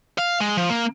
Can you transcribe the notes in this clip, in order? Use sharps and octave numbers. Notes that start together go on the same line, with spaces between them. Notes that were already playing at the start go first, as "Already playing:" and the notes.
F5
G#3
F3
A#3